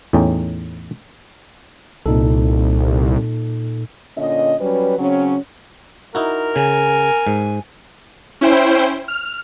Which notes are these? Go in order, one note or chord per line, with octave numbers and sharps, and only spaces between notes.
E2 A2 C#4 D#4 G5
C2 A#2 D#4 A4
A#2 D3 C#4 D#5
F#3 G3 C#4 B4
C#3 F#3 C4 C#4
D#4 E4 F#4 A#4
C#3 G#5
G#2
C#4 E4 C5 G5
F6